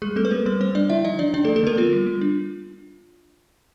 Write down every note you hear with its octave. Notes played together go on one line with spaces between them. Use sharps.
G3 G#3 G#4
A3 C4 A4
B4
A#3 C4 A#4
G3 B3 B4
G3 C4 C5
G3 D4 D5
D3 E4 E5
F3 D#4 D#5
F3 D4 D5
D3 D4 D5
A3 A4
F3
A3 A4
D3 A#3 A#4
B3 F4
G3
G3
D4